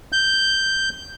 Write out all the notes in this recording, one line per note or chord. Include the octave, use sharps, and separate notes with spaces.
G6